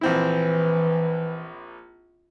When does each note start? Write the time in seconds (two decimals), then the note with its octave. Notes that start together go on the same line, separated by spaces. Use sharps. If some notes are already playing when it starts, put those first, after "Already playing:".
0.01 A#1 E3 C4 E4